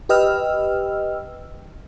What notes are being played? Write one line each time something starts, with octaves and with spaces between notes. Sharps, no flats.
G4 B4 D#5 G5 E6 F6